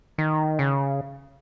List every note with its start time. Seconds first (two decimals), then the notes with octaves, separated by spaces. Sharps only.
0.18 D#3
0.59 C#3